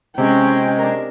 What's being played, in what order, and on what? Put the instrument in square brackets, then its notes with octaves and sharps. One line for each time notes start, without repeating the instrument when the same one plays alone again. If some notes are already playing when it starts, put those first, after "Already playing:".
[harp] C3 [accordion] G#3 [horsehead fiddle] C#4 G5
[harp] D4 A#4